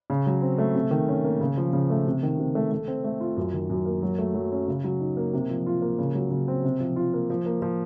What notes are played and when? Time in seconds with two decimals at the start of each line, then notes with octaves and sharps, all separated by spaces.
0.10 C#3
0.27 F#3
0.42 C4
0.58 A3
0.75 C3
0.91 D#3
1.08 C#4
1.25 A#3
1.40 C#3
1.57 F3
1.73 C#3
1.90 A3
2.06 C3
2.23 D#3
2.39 C3
2.55 A3
2.71 A3
2.88 C4
3.04 A3
3.20 F4
3.37 F#2
3.53 D#3
3.70 F#2
3.85 A#3
4.03 F#3
4.19 A3
4.34 F#3
4.52 C#4
4.68 C#3
4.84 F#3
5.00 D#4
5.17 A#3
5.33 C3
5.50 F3
5.66 F4
5.82 A#3
5.98 C#3
6.15 F#3
6.31 C#3
6.48 C4
6.64 C3
6.80 F3
6.96 F4
7.14 A#3
7.30 F3
7.46 A#3
7.62 F3